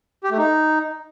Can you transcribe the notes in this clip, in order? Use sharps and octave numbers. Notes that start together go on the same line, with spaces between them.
G4
A3
D#4